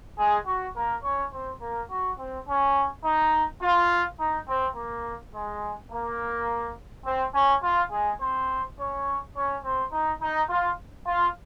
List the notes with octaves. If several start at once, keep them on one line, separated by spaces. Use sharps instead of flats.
G#3 G#4
F#4
A#3 A#4
C#4 C#5
C4 C5
A#3 A#4
F#4
C4
C#4
D#4
F4
D#4
C4
A#3
G#3
A#3
C4
C#4
F4
G#3 G#4
C4 C5
C#4 C#5
C#4 C#5
C4 C5
D#4
D#4
F4
F4